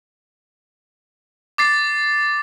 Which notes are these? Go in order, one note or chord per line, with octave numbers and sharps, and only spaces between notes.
D6 A6 C7